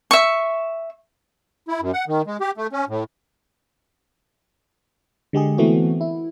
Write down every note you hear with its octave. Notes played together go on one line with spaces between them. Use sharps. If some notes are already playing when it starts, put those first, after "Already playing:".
E5 C#6
E4
F#2
F#5
D#3
G#3
G4
A3
C#4
A2
D3 G#3 G4 G#4
E3 A3 B3 C4 F#4
E4